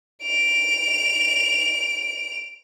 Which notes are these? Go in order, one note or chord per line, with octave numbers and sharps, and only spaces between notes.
D7 F7